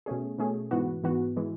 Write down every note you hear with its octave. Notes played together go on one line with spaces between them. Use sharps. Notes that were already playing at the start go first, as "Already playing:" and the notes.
B2 A3 C#4 G#4
B2 A3 C#4 G#4
G#2 E3 B3 F#4
G#2 E3 B3 F#4
E3 G#3